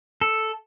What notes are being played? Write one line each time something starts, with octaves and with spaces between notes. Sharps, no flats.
A4